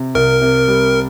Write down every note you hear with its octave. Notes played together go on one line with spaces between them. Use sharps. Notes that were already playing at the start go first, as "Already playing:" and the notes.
Already playing: C3
C2 A#4
C3
G3